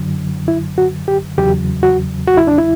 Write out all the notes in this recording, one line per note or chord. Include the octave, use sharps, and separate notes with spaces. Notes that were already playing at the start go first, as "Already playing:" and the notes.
Already playing: F#2 D3 F#3
E4
F#4
G4
E2 C#3 F#3 G4
F#4
F#4
E4
D4
E4